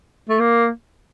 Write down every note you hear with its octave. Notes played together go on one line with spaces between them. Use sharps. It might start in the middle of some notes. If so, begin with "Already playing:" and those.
A3
A#3